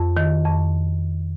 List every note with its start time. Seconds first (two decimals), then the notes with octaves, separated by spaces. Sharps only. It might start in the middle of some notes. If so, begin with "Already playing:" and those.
Already playing: F2
0.17 D#3
0.45 F2